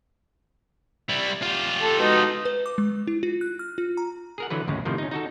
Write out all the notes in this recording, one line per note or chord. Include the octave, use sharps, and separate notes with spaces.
G3 E4
F4 G4
A4
B2 G#3 D#4
B4
D6
G#3
E4
F4
F#6
F6
F4
A#5
G#4 A#4 F#5
D3 E3 F#3 B4
G#1 D2 C#3 G#3
A2 C3 D#3 F3
C#4 D#4
D#4 F#4 A4